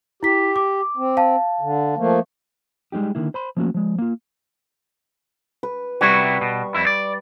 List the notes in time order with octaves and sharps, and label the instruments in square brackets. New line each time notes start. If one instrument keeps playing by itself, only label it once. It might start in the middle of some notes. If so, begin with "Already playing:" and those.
[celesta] E4 B6 [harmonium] G4
[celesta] D6
[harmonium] C4
[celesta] F5 A5
[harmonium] D3
F3 A3 A#3
[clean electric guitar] G3 G#3 A#3 D#4 G4
D3 D#3 A#3 E4
C5 B5 C6
F3 A3 A#3 C#4 F#4
F3 G#3
A#3 F4
[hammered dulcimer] B4
[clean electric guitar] C3 E4 F#4 [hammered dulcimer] G3 C#6
[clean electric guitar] B2
F2 E4
D5